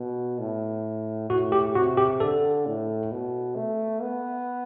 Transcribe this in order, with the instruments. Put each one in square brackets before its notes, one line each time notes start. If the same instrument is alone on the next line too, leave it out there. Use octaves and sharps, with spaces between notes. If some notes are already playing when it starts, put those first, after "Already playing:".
Already playing: [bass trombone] B2
A2
[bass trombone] A2 [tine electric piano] F#4
[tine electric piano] G4
[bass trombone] C3 [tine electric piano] F#4
[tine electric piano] G4
[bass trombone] D3 [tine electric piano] A4
[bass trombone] A2
B2
A3
B3